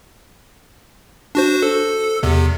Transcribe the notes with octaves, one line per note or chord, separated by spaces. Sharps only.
D4 F#4 C5
A4
E2 C3